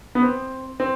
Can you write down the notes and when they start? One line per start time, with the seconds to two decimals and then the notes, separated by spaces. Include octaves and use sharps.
0.15 B3
0.23 C4
0.80 C4